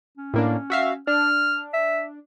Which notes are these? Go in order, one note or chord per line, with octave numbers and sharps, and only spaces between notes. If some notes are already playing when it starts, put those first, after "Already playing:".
C#4
A2 A#3 D4
F#4 E5 F5
D4 F6
E5